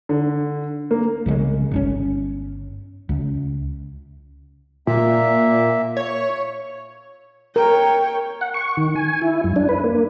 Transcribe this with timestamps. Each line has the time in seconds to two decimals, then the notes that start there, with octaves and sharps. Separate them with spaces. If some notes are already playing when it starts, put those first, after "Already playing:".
0.09 D3
0.91 A#3
1.26 C2 C#3 F#3 G#3
1.71 G1 D3 C#4
3.09 C#2
4.87 A#2 A#3 E5
5.97 C#5
6.08 C#6
7.56 A#4 C#5 G5
8.41 F#5
8.54 C#6
8.77 D#3
8.96 G#5
9.22 E4
9.44 F#2
9.56 D4
9.69 B4
9.84 A#3